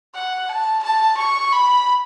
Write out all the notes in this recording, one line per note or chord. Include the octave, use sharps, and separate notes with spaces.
F#5
A5
A5
C#6
B5